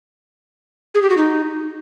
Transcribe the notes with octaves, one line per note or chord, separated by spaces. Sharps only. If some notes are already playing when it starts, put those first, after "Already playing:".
G#4
G4
F#4
D#4